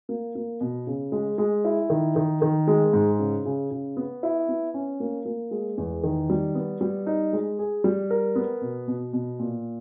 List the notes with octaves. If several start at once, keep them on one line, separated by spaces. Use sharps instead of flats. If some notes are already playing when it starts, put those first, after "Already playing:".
A#3
A#3
B2
C#3
G#3
G#3
E4
D#3
D#3
D#3
G#3
G#2
C#3
C#3
C#3
B3
E4
B3
C#4
A#3
A#3
G#3
E2
D#3
G3
B3
G3
D#4
G#3
G#4
G3
A#4
B3
B2
B2
B2
A#2